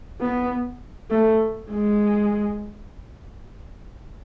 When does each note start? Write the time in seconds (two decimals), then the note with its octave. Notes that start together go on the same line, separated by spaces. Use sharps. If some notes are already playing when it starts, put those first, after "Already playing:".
0.21 B3
1.10 A3
1.71 G#3